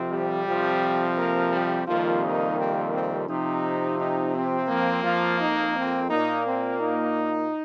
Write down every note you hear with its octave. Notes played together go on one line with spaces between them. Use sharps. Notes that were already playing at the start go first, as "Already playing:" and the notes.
Already playing: F2 C3 F3 C4
G3 G4
F2 C3 F3 C4
A#3 A#4
G3 G4
F2 C3 D#3 F3 G3 A#3 F4
D#4
C4
C4
C3 F3 C4 D#4
D#4
C4
F2 F3 A#3
F3 F4
D#4
C4
A#2 A#3 D#4
C4
D#4